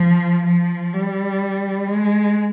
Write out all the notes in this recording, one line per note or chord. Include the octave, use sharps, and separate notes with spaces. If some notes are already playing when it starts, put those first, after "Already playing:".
Already playing: F3
F3
G3
G#3